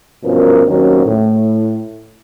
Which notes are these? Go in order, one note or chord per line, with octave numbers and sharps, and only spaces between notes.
G2 B2 F3 C#4 A#4
D#2 D#3 F#3 A#3 C4 C#4
A2